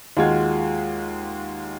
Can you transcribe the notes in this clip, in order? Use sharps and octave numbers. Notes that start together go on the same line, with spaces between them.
D#2 G#3 F4 F#4 G#6